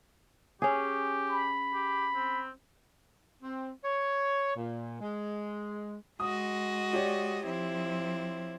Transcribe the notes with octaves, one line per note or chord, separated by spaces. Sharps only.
C#4 G4 G#4
B5
G4
C4
C4
C#5
A#2
G#3
G#3 F#4 D#5 D#6
G4 C#5 D5
F3 C4 E4